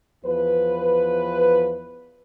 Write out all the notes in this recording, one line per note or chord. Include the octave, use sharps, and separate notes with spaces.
E2 F3 B4